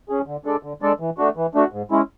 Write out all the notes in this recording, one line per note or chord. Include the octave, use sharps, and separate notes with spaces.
C#4 G#4
D3
G#3 D4 A4 D5
D3
G#3 D4 A4 D5
E3
A3 D4 F#4
E3
A3 D4 F#4
G#2
G#3 C#4 E4